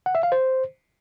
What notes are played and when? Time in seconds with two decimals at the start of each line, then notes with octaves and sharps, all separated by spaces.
0.06 F#5
0.15 E5
0.23 F5
0.32 C5